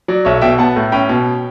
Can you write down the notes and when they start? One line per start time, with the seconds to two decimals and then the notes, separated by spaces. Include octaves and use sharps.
0.08 F#3 D5
0.25 B1 C#5 E5
0.41 B2 E5 G5
0.58 B3 F#5 A5
0.76 A2
0.92 C#4 G5 B5
1.09 B2